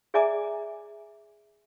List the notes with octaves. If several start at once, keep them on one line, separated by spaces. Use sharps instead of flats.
G#4 D5 E5 G#5 A#5 D6